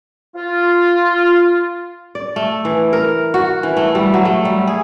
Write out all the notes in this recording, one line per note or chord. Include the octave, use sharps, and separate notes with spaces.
F4
D5
A3
E3
A#4
F#4
E3
A3
G3
F#3
A3
G3
G#4